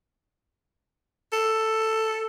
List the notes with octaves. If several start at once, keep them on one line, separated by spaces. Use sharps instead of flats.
A4